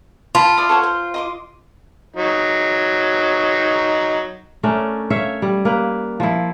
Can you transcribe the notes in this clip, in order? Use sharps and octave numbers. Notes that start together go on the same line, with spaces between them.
F4 A5 B5
E4 D5 D#6
A4 C#5 F#5
C5
D#5 C6 D6
F#3 D#4
A3 C#4 D4 A#4
C#5 E5 F5
G3
A#3 B4
F3 E4